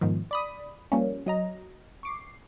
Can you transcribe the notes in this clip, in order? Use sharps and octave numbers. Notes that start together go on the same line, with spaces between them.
G#2 B2 D#3 F3
D5 B5 D#6
F3 G3 A#3 C#4
F#3 D#5 A#5
C#6 D6 C7